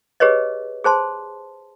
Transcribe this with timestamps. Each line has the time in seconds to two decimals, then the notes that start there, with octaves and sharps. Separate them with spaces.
0.20 G4 G#4 B4 C#5 D#5
0.84 G#4 C5 A5 C6